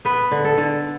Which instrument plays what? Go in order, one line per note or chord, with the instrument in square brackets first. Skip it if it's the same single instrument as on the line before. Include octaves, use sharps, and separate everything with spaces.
[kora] B3 B4
D3
A4
D3